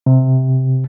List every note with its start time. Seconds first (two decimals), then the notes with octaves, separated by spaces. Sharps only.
0.06 C3